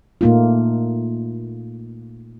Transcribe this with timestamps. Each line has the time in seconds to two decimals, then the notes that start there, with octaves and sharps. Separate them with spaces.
0.21 A#2 A3 A#3 D#4 F4